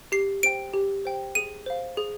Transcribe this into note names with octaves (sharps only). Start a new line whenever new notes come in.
G4 C7
C5 G5 D7
G4
C5 G5
G#4 D#7
C5 F5
G#4